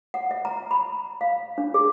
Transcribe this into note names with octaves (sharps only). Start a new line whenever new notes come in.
F#5
E5
A#5
B5
F5
D4
G#4